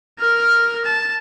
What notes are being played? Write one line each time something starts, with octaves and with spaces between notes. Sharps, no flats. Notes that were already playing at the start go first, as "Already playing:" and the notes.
A#4 F6
A5